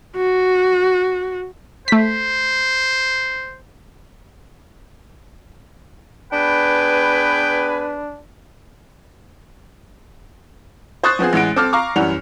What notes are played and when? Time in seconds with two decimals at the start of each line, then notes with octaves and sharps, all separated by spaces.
0.17 F#4
1.88 A3 C5 B6
6.32 B3 D4 G#4 B4 G5
11.04 C5 C#6 D#6 F#6 A6
11.19 F3 B3 C4 G#4
11.33 A1 E3 G#3 F#5 D7
11.56 C4 A4 D6 F6
11.73 F5 A#5 C#6 D6
11.96 F#2 E3 G3 F#5 F7